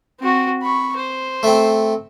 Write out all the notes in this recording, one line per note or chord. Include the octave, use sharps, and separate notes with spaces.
C4 F#4
B5 C#6
C5
A3 C4